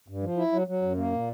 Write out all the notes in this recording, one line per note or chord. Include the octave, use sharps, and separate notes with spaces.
G2
F3
E4
F#3
F#3
F#2
A#3
A#2